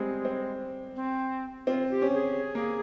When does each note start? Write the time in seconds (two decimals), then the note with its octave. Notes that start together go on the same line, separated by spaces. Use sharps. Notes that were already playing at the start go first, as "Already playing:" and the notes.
Already playing: G3 G#3 C4
0.25 C4
0.96 C4
1.67 C4 F4
1.90 G4
2.02 C#4
2.14 G#4
2.55 A#3